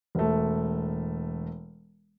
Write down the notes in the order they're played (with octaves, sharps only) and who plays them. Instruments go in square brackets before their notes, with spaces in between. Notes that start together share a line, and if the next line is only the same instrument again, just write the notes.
[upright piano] E1 A3